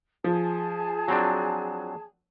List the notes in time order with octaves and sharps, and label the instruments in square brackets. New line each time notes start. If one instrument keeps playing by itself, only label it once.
[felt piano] F3 [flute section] G#4 A5
[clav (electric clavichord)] F#3 C4 D4